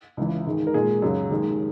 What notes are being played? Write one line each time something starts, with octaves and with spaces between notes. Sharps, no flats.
C#2 C#3 E3
G#2 D#3 G#3
A#4
A#2 G#3 G#4
F#2 C#3 F#3
D#2 D#3 G#3